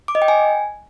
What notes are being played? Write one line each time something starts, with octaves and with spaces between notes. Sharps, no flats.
D6
D#5
G5
G#5